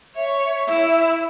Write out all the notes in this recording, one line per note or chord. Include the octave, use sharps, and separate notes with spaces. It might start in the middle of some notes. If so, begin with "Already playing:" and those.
C#5 E5
E4